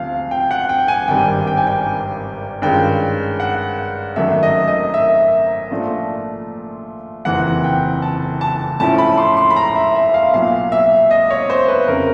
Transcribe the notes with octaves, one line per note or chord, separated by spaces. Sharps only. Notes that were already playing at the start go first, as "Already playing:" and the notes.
Already playing: D2 C3 F3 F5
G5
F#5
G5
G#5
G#1 G2 D#3 G3 G5
G5
G#5
G5
G2 D#3 G#3 C#4 F4 G5
F#5
G#1 F#2 D#3 F#3 A3 E5
D#5
D#5
E5
A#2 F3 A3 D4 F4
F#1 F2 C3 E3 F#5
G5
A5
A5
A2 F3 A3 C#4 E4 A5
B5
C6
C6
B5
A#5
E5
E5
F5
B1 A#2 F#3 F5
E5
D#5
C#5
C5
B4
F1 F2 C#3 A#4